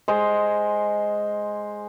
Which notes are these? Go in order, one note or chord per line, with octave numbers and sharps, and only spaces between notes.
G#3 C5